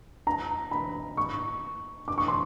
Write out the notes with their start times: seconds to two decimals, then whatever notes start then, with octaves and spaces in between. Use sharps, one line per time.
0.27 A#5
0.71 B5
1.17 C#6
2.08 D6
2.18 C#6
2.28 C6